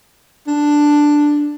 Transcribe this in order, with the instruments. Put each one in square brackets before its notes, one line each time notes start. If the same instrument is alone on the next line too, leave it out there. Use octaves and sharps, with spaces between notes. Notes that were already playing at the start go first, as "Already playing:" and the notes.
[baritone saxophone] D4